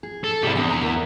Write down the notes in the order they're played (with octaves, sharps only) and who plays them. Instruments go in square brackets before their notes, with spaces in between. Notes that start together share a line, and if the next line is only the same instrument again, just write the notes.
[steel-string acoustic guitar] G#4
[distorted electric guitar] A4
[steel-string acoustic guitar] G#2 C3 D5 [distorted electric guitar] G3 E4
[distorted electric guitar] E2 [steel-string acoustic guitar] D4 G5 G#5
[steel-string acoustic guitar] D5 A#5
D#3 B3